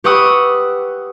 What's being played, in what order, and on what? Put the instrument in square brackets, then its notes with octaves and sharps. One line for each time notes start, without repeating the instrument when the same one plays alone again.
[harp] G4 B4 F#5 C#6 D#6 E6